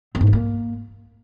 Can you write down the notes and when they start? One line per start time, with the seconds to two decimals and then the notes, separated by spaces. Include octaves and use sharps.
0.15 C4
0.21 G#2
0.27 C#4
0.33 A#3